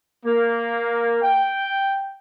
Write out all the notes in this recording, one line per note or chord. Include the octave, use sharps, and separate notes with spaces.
A#3
G5